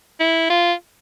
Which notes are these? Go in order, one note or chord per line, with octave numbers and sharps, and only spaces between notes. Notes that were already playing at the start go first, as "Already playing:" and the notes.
E4
F4